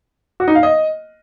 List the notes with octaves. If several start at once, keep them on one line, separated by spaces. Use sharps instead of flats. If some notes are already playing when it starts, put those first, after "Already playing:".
F#4
D#4
F5
D#5